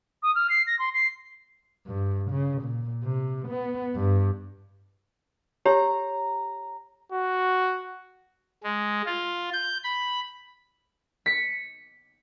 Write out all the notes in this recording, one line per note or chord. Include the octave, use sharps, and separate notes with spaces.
D#6
F6
C7
A#6
C6
C7
G2
C#3
A#2
C3
B3
G2
G4 C#5 A#5
F#4
G#3
F4
G6
B5
B6 C#7